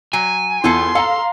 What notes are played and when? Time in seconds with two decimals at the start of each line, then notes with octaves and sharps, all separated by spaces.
0.13 F#3 G#5
0.64 E2 E4 F4 A4 C6
0.95 A4 F5 A#5